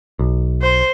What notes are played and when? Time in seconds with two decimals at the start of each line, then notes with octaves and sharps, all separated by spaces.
0.19 B1
0.62 C5